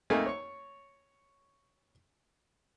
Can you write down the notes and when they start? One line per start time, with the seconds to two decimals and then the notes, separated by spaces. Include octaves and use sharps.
0.10 F2 A3 A#3 D#4 G#5
0.26 C#5 C#6